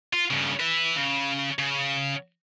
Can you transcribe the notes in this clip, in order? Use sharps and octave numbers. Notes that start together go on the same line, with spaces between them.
F4
G2 C#3
B4 E5
C#3
C#3